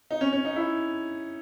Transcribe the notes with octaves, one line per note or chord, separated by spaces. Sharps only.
D#4
C#4
C#4
D#4
E4